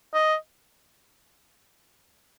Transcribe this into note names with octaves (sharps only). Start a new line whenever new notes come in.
D#5